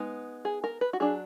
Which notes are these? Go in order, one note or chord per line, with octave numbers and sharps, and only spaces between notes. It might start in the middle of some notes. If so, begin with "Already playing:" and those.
Already playing: G#3 B3 D#4
G#4
A#4
B4
F#4
F#3 D4 G#4